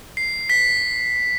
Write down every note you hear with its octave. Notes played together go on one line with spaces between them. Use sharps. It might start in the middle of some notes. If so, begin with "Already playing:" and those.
C7
B6